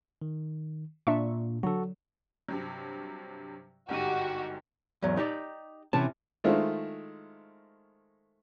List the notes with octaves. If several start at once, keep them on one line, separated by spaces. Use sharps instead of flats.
D#3
A#2 D4 E5 C#6
D3 F#3 F#4 A4
G2 C3 F#3
G1 G#2 F#4 G4 D#7
E2 G#2 F#3
D#4 G4 D5
C3 E3 C#4 A5
D#3 G#3 A3 E4 F4 C5